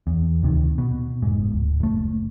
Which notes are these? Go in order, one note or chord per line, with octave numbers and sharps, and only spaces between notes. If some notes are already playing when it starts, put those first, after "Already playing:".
E2
D2 C3 D#3
B2
F1 G#2
D1
F#1 A3